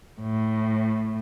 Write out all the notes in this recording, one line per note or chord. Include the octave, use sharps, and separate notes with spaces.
A2